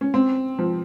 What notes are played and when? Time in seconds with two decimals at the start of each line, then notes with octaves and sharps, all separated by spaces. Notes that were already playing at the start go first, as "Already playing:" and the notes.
0.01 C#4
0.14 C4
0.59 F3